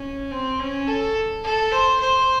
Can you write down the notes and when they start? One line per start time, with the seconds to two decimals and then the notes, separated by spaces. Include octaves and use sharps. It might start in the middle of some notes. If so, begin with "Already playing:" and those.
Already playing: C#4
0.31 C4
0.59 C#4
0.87 A4
1.44 A4
1.72 C5
2.01 C5